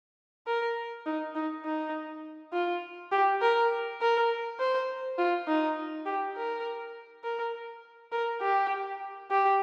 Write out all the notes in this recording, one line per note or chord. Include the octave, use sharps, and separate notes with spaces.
A#4
D#4
D#4
D#4
F4
G4
A#4
A#4
C5
F4
D#4
G4
A#4
A#4
A#4
G4
G4